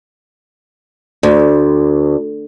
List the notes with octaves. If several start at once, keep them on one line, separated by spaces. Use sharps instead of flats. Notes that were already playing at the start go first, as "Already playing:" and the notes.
D2